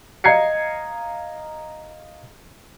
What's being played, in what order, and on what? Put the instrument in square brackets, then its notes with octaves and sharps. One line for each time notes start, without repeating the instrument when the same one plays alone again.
[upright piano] D#5 F5 A#5 G#6 C7 C#7